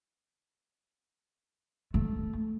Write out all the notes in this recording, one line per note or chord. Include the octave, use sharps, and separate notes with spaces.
A3